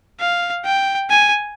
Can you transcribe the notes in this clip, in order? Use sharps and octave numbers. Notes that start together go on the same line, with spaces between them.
F5
G5
G#5